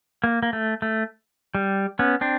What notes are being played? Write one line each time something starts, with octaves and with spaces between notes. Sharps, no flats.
A#3
A#3
A3
A3
G3
B3 C#4
C4 D4